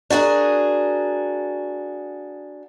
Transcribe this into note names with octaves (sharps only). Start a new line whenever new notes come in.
D4 F#4 G#4 A#4